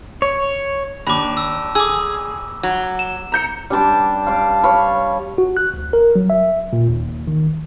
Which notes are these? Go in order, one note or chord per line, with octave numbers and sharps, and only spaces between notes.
C#5
D#2 D4 B5 D6
E6
G#4 D6 E6
F#3
E7
A#5 G6 C#7
G3 D4 A5 D6
D4 D5 F5
C#5 F5 B5
F#4
F#6
D2
A#4
F#3
E5
A#2
D#2
D#3
G1